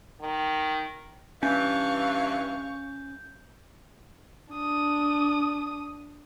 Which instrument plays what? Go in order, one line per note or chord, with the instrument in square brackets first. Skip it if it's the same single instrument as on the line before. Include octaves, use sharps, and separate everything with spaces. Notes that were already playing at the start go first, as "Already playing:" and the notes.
[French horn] D#3
[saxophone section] G2 E3 [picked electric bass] C#4 [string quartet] F5 C#6 [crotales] G6
[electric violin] D4 D#6